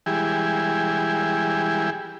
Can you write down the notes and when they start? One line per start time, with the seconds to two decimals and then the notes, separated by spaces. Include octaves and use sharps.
0.06 E3 G3 G#3 E4 G4 G#4